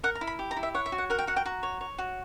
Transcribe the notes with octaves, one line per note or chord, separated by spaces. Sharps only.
A#4 F#5
A#5
E4
B5
G4
A#5
E4
E5
C#5 F#5
E5
F#4
F#5
A#4 F#5
G5
F#4 F#5
G5
F#4 A#5
C#5
C#5
F#4